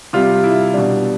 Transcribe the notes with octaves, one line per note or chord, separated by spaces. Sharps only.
C3 G3 F4
E4
B2 G3 D4